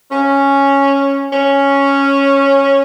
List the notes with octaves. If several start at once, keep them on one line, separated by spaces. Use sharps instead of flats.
C#4
C#4